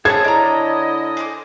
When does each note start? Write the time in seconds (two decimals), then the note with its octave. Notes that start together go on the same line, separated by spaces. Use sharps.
0.05 G#4 A4 C5 C#5 E5 A5 G#6
0.24 D3 E4 D#5 A#5 D6
1.17 G#4 C5 D6